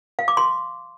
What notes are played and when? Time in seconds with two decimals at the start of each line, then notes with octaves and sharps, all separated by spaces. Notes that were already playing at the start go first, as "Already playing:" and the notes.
0.19 F5
0.28 D6
0.37 C6